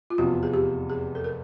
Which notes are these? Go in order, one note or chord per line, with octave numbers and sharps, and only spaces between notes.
F4
F1 E2 C3 F3 F#4
G#4
G4
G#4
A4
A#4